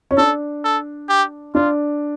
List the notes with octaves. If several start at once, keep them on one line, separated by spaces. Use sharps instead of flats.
C#4
D4 A4
A4
G4
D4 F4